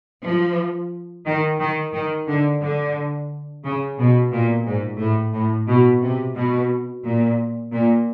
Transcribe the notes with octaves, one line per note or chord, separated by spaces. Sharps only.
F3
D#3
D#3
D#3
D3
D3
C#3
B2
A#2
G#2
A2
A2
B2
C3
B2
A#2
A#2